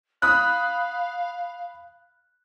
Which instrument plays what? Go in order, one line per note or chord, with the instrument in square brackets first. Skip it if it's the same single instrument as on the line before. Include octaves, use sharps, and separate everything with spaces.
[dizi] F5 [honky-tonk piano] B5 D#6 F#6